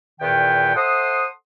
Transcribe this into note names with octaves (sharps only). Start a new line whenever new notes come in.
E2 A#2 D#3 B3 G5
A4 C5 E5 F#5 C6 D#6